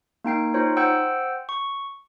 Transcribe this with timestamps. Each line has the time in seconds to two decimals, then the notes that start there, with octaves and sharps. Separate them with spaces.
0.24 A#3 D#4 G5 C7
0.54 D#4 F4 C5 C#5
0.77 C5 F#5 G5 E6
1.49 C#6